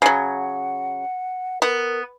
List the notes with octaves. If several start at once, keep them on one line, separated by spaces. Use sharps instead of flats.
C#3 F#3 F#5
B3 A#4